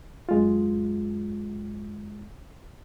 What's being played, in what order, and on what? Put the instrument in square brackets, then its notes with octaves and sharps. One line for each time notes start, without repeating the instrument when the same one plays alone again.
[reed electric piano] F#2 G#3 F4